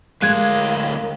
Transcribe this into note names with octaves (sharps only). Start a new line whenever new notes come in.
D2 G#3 A3 A#4 F5 F#6 G#6